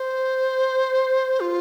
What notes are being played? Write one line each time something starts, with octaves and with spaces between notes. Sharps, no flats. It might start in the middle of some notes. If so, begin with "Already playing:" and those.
Already playing: C5
F4